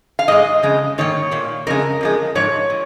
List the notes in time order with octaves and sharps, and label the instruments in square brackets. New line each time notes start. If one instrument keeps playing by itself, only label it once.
[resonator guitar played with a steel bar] F5
G#2 G#3 D#5
F2 C#3 G#3
G#2 D#3 A#3 C#5
A#2 A#3
F2 C#3 G#3 A#4
F2 F3 G#3
G#2 F3 C#5
A#2